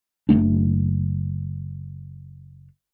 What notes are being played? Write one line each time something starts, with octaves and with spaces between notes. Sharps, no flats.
F#1 F#2 A3 D4